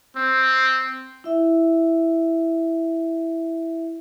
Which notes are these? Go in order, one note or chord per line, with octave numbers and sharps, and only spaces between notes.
C4
E4 E5